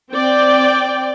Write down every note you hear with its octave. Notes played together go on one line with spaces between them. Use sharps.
C4 D5 G5